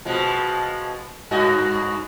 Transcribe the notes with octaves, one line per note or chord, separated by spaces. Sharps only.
B2 F3 G#3
G2 F#4 D#5